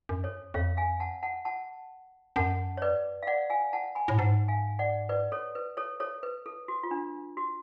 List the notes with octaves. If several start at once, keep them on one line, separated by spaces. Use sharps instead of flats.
F#2
A4 C#5
F2 C#5 F5
F5 G#5
F#5 A5
F#5 A5
F#5 A5
F#2 F#5 A5
C#5
B4 D5
F5
D5 F#5
F5 G#5
F#5 A5
G#5 B5
A2
G#2 F#5 A5
F5 G#5
D5 F#5
B4 D5
A4 C#5
B4
A4 C#5
A4 C#5
B4
A4
F#4
F4
D4
F#4